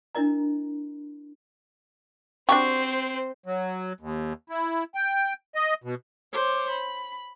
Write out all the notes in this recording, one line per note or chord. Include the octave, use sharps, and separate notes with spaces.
D4 E4 A#4 D#5 A#5
C4 D4 F#4 G4 C5 C#6
F#3
D#2
E4
G5
D#5
B2
C5 C#5 D6
B5